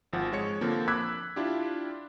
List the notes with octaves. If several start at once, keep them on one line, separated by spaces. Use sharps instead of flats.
G#1 F3 F#5
G#3 C#5 C#7
D3 F3 A#3 C4
B5 D6 E6 F#6 G#6 B6
D4 E4 F4 G4